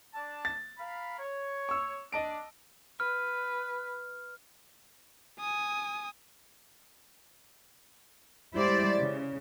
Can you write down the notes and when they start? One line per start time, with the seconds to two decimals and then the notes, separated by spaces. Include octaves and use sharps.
0.14 D4 A5
0.45 A6
0.78 A#4 F5 B5
1.19 C#5
1.69 C#6 E6
2.12 D4 D#5 A5 D7
3.00 B4 F6
5.40 G#5 D#6
8.55 G3 G#3 E4 G4 C5 D5
8.96 C#3